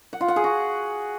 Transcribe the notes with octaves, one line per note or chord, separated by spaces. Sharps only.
F#5
F4
F#5
G#4
F#4